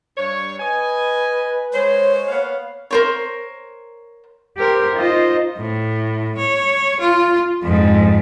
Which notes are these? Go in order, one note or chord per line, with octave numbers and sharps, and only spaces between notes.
G2 C#5
B4 D#5 G#5
G#3 C5 C#5
A#3 B3 F5
A#4 C5 C#5
G4 A#4 C5
D#4 F4 C5 D#5
A2
C#5
F4
F2 G#2